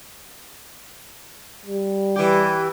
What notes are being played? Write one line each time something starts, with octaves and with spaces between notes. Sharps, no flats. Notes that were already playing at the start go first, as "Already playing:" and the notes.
G3
E3 G4